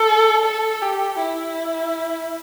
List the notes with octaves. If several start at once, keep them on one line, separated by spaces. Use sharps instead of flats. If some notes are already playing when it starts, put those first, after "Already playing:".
Already playing: A4
A4
G4
E4